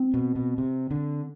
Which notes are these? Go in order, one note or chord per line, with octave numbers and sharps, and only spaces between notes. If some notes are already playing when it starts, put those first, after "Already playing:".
Already playing: C4
B2
B2
C3
D3